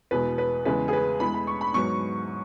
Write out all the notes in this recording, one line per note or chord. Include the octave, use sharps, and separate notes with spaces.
E2 B2 G#3 B4
B4
E2 C#3 E3 G#3 B4
G#4
B4
E2 E3 G#3 B5
B5
C#6
B5
G#2 F#3 B3 C#6